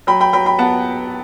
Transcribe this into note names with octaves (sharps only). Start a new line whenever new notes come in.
F#3 G5 B5
G5 B5
F#3 G5 B5
G5 B5
B3 F#5 A5